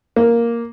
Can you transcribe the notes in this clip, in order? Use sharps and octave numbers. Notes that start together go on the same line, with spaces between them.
A#3